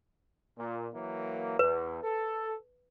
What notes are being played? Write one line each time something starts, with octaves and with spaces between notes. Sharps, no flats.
A#2
E3 F#3 A#3
E2 B4
A4